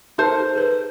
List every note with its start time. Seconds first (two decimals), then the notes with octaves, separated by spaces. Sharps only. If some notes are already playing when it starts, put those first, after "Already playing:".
0.18 D#4 A4 A#4 C5
0.55 G#4 B4